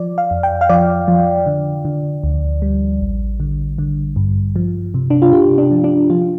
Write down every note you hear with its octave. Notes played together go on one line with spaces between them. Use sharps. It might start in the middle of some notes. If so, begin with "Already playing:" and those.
Already playing: F3 D5
F5
F2
G5
F5
F3 D5
F3
D3
D3
D2
G3
A1
D3
D3
G2
F3
C3
D4
F4
C3 G4
D4
F3
D4
F3 F4